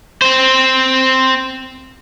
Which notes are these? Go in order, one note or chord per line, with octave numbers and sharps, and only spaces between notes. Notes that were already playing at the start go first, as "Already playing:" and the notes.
C4 C5